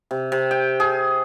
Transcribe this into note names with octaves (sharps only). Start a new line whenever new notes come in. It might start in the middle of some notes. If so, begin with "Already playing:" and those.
C3
C3
G5
G#4